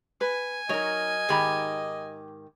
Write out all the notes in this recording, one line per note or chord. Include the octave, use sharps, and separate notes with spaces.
B4 G#5
F#3 D#4 A#4 C#5 D#5
G#2 D#3 G4 G#4 B5